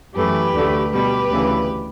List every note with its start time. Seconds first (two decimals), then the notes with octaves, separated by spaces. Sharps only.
0.16 F#2 E3 A3 G4 B4
0.54 D2 D3 A3
0.93 B2 G3 G4 B4
1.31 D2 C#3 E3